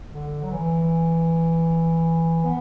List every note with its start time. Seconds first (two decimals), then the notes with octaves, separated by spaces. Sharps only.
0.12 D3
0.43 F#3
0.51 E3
2.44 B3